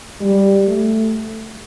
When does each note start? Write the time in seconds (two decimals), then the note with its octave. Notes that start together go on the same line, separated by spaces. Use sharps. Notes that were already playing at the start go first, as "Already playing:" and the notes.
0.21 G3
0.67 A3